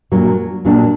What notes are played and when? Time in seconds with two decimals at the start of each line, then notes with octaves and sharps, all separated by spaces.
0.12 A#2 F#3 A#3 D4
0.65 A#2 F#3 A#3 D4